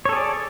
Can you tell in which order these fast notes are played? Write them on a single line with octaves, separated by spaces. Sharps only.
C#5 A4 G#4 D5